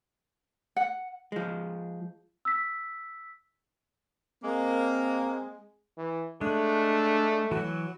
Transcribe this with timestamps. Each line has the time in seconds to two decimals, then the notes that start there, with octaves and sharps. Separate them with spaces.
0.76 F#5
1.32 F3 G#3
2.45 E6 B6
4.44 G#3 A#3 C4
5.97 E3
6.41 G#3 A3 D4
7.51 E3 F#3 F#4